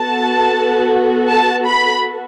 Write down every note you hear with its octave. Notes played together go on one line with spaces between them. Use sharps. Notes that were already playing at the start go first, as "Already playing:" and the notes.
Already playing: B3 F#4 A4 A5
A5
B5